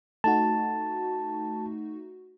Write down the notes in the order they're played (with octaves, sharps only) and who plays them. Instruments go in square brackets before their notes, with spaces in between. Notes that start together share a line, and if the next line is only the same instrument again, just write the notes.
[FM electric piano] A3 D#4 F#4 [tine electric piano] A5